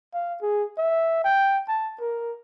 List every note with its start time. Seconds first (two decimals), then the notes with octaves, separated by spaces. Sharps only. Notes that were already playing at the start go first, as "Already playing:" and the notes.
0.14 F5
0.42 G#4
0.78 E5
1.24 G5
1.68 A5
2.00 A#4